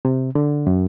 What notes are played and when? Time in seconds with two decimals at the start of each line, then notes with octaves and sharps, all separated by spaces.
0.05 C3
0.35 D3
0.67 F#2